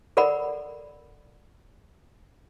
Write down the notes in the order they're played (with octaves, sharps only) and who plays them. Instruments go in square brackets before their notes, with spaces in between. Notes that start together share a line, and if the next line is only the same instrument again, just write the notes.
[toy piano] A4 A#4 D5 F#5 B5